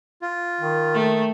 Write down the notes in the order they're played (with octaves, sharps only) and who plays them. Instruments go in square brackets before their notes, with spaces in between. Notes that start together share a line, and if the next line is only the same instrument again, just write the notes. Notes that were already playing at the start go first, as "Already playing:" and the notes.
[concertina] F4
[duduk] D#3
[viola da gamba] A3